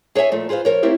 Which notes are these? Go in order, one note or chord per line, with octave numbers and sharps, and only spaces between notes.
G#4 C#5 D5 E5 G#5
A#2 F3 A3
F4 G#4 B4 C5 F5
F3 A#4 C#5
A3 A#3 C4 E4 G4 A#4